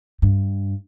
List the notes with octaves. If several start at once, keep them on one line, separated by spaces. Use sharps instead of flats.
G2